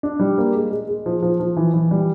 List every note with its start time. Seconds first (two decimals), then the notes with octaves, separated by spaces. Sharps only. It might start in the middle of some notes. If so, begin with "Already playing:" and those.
0.03 D4
0.20 G3
0.38 A#3
0.54 G#3
0.71 G#3
0.88 G#3
1.06 F3
1.22 F3
1.40 F3
1.57 E3
1.74 E3
1.91 G3